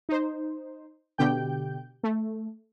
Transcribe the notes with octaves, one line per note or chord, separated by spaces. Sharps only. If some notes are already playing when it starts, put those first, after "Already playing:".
D#4 C5
B2 D3 G4 G5 G6
A3